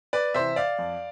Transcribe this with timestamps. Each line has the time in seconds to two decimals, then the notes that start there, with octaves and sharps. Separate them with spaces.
0.13 B4 D5
0.34 C3 E3 C5 E5
0.56 D5 F5
0.79 F2